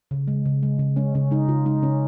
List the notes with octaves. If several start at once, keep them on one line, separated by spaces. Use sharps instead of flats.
C#3
G#3
C#3
G#3
C#3
G#3 C#4
C#3 C#4
G#3 D#4
C#3 F4
G#3 D#4
C#3 C#4